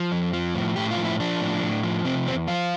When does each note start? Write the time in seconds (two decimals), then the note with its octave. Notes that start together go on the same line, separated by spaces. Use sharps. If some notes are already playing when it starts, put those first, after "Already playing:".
Already playing: F3
0.12 F2
0.33 F3
0.55 A2
0.76 A2 G4
0.91 F4
0.97 F3
1.05 E4
1.20 F3 D4
1.41 A2
1.63 A2
1.83 F3
2.05 C3 C4
2.27 E2 C4
2.48 F3 F4